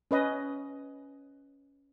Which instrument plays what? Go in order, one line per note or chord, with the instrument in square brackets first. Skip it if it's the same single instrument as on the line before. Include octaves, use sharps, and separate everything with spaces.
[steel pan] C#4 B4 D#5